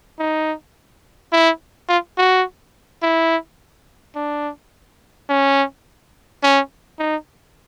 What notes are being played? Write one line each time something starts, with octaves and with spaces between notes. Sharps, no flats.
D#4
E4
F4
F#4
E4
D4
C#4
C#4
D#4